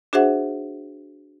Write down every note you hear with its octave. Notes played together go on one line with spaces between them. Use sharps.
D4 F#4 G#4 C5 E5 F#5